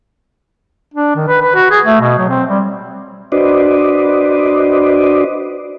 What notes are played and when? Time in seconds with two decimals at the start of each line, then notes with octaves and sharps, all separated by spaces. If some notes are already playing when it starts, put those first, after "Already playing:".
0.94 D4
1.15 D#3
1.28 B4
1.41 B4
1.55 F#4
1.71 G#4
1.85 A3
2.01 B2
2.18 F#3
2.29 C4
2.50 G3
3.32 D4 F#4 B4 C5 D5 D#5